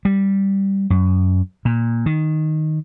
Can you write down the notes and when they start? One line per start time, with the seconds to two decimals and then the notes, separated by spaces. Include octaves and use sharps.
0.05 G3
0.90 F#2
1.65 A#2
2.06 D#3